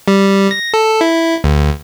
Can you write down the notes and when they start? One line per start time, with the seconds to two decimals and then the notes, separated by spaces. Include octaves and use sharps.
0.08 G3
0.51 A#6
0.74 A4
1.01 E4
1.44 D2